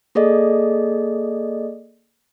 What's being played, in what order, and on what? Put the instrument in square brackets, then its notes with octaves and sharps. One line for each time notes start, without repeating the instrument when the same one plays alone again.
[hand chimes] A#3 G#4 A4 D5 D#5